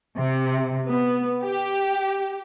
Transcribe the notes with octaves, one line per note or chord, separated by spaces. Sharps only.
C3
B3
G4